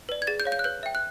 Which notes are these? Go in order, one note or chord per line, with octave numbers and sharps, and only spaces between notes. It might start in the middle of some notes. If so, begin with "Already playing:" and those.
B4 D5
G#6
G#4 A6
G6
C#5 F5
G6
F#6
B4 G6
E5 G5
F#6